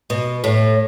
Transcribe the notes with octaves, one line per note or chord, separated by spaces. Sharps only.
B2
A2